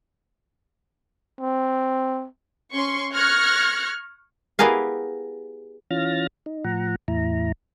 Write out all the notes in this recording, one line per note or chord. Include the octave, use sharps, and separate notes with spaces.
C4
C#4 C6 C#6
C#6 F6 F#6 G#6 A#6 C#7
B3 E4 G4 G#4 A#4 F5
E3 C#4 F4 F6 A6 A#6
D#4
A2 F3 F#5 A#5
E2 A2 E4 A#5